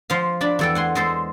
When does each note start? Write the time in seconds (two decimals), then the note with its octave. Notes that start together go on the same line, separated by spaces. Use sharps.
0.10 F3 C5 F5
0.41 D4 A5 B5
0.59 E2 A4 G5
0.75 F#5 G#5 C6
0.95 G#3 A4 C5